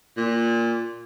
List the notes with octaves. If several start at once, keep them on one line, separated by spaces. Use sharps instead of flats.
A#2